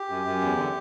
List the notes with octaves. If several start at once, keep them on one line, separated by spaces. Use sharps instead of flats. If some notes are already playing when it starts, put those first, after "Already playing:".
Already playing: G4
F#2
F#2
E2
D3